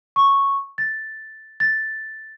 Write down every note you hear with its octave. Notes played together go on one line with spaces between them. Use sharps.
C#6
A6
A6